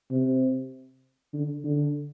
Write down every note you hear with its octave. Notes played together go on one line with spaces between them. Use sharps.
C3
D3
D3